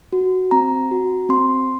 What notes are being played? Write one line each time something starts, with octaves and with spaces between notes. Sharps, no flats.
F#4
C4 A#5
F#4
C4 C6